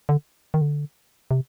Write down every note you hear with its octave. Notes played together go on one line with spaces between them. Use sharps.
D3
D#3
D3
C3